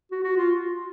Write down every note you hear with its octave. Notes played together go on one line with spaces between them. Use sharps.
F#4
F#4
F4